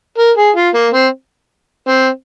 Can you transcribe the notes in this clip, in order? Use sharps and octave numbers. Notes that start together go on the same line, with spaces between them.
A#4
G#4
F4
A#3
C4
C4